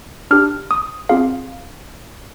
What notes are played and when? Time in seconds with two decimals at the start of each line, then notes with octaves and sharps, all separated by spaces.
0.31 D4 G4 F6
0.71 D#6
1.09 C4 F4 G#4 F5